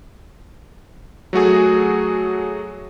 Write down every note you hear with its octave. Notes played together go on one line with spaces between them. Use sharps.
F#3 A3 F#4 G#4